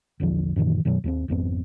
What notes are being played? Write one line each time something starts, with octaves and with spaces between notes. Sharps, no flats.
A#1 E2 D3 F3
F#2 A#2 D#3 E3
F#2 B2 D#3 F#3
D#2 G3 C4
G#1 F2 B3 C4